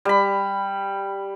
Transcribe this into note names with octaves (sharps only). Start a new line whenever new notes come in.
G3 B5